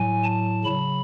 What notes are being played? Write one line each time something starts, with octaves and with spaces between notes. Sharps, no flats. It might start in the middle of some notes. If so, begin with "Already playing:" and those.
Already playing: A2 F#3 G#5
A5
C#3 F#3 B5